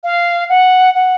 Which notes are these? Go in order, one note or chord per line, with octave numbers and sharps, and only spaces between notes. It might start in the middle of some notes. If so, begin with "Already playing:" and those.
F5
F#5
F#5